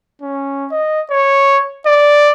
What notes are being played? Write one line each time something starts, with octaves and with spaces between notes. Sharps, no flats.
C#4
D#5
C#5
D5